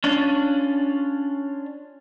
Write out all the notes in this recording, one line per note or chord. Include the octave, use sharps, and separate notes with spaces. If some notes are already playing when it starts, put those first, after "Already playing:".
C#4 D4 F4